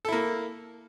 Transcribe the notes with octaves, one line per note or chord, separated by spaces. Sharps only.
A#3 E4 A4